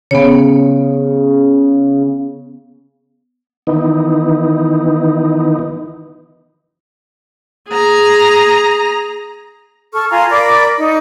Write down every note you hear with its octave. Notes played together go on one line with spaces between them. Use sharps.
C#3 B3 C#5
D#3 E3 B3 D#4
G#4 A#5
A4 C#6 F6
F4 G#5 A#5 C6
A#4 D5 B5 D6
D#4